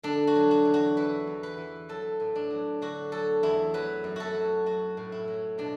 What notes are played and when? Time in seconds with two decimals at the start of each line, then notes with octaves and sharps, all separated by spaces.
0.03 D3 D4
0.27 F#4
0.36 F#3
0.51 F#4
0.65 E2
0.74 F#4
0.97 E3 B4
1.27 E2
1.43 B4
1.58 E3
1.89 F#3 A4
2.20 A2
2.35 D4
2.50 F#3
2.82 D3 F#4
3.12 F#3 A4
3.43 E2 E4
3.74 F#3 B4
4.04 F#2
4.16 F#4 A4
4.35 F#3
4.66 F#3 F#4
4.97 A2
5.12 E4
5.28 F#3
5.58 B2 D4